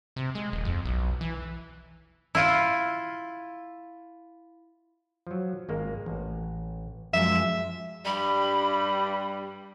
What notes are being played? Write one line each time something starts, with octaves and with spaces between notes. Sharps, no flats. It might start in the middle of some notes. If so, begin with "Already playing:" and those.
C3
G#3
D#1
F2
B1
E3
E4 F4
F3 F#3
G#1 G#3 A#3
A1
F#2 F3 G#3 F4 E5
G2 G3 B5